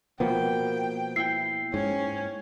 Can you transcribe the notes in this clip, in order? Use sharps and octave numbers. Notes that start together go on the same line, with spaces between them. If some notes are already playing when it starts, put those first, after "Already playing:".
B2 F3 A#3 B3 G5
E4 G5 C7
G#2 C#4